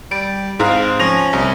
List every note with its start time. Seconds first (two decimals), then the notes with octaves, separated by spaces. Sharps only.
0.11 G3 D7
0.60 G#2 C4 F5 A#5
0.99 F3 C#4 A#6 F7
1.33 C2